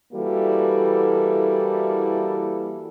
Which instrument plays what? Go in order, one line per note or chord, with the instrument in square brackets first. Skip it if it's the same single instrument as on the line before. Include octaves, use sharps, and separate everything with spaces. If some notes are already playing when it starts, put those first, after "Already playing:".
[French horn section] E3 G3 A#3 E4 F#4 A4